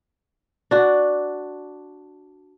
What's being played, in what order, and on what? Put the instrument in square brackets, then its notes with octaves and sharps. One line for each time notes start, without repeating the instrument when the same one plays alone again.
[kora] D4 F#4